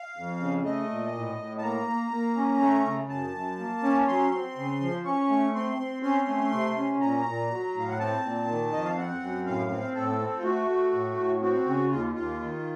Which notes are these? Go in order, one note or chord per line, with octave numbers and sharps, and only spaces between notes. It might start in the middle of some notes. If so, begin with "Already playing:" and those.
Already playing: F5
F2
C#3
A3 D#5
A#2
A2
A2
A5
A#3 A#5
A#3
A#3
C#4
A3
C#3
F#2 A5
F#2
A#3
C#4
F#3 C6
C4
C#3
F3
C#4 C#6
A3
C4 C6
C4
C#4 C6
A3
C3
C#4
A#2 A#5
A#2
F#3
A2
F5
F#5
C4 A5
A#2
D#3
F2 D#5
F5
C4 F#5
F#2
A2 F5
C4
A2 A4
C4
F4
A3 F#4
A3
A2
A2
C4 F#4
C#3
D#2 F4
D#2 F4
D#3